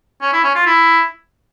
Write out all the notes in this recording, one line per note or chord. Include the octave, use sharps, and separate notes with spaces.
C#4
E4
C#4
F4
E4